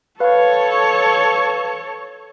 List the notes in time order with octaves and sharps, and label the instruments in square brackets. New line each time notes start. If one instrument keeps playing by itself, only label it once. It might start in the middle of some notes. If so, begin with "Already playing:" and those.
[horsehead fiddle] A4 C#5 [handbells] B4 F5